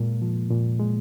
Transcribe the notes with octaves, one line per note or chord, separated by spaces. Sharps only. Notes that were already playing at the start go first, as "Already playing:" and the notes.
Already playing: A#2 G#3 A#3
F3
A#2
G#3